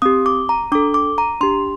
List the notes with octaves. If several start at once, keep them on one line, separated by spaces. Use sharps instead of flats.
C4 G4 D#6
D6
A#5
D4 A4 D6
D6
A#5
D4 G4 C6